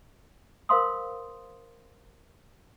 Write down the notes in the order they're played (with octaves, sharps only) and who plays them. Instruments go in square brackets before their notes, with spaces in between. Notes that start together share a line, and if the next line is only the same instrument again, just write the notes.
[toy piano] A#4 C5 F5 C6 D#6